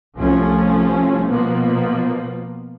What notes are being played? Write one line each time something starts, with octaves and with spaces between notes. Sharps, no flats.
C2 F3 A3 C#4
B2 F3 A#3 B3